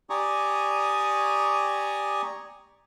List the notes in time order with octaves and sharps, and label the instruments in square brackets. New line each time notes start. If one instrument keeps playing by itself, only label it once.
[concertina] G4 D5 G#5 A#5 C#6 D#6